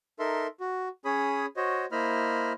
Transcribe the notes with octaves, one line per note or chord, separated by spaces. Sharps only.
D#4 A4 A#4 E5 C6
F#4
C#4 G#4 C#5 B5 D#6
F#4 C5 C#5 D#5
A#3 E4 C5 D#5 B5 F6